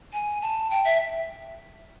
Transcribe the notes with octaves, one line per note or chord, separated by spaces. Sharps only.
G#5
A5
G5
E5